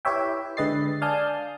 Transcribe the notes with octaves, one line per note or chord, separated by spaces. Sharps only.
E4 G4 B4 C#5 E5 G5
D3 G#3 B4 D#5 A6 C7
D5 F5 G#5 A5 D#6 G6